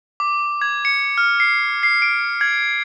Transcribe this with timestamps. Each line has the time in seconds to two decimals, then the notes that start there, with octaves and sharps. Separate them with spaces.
0.20 D6
0.62 G#6
0.85 C#7
1.18 F6
1.40 C7
1.83 C7
2.02 D7
2.41 G#6